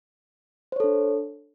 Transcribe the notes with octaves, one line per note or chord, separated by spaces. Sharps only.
D4 A4 C5 C#5